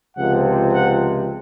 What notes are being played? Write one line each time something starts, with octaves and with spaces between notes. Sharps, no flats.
C#2 C3 F3 F#5
F#5